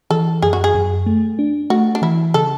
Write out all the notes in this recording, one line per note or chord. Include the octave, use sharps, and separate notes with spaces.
E3 A4
F#2 G#4
F#4
G#4
F#2
A3
D4
A3 F#4
D4
E3 E4
C#3 A4